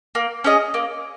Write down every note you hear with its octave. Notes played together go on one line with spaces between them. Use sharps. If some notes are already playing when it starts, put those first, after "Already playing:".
A#3
C#4 G#4 D#5
A#3